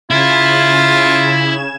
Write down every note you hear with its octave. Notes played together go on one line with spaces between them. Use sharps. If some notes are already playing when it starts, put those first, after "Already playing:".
C#3 E4 F4 G#6 E7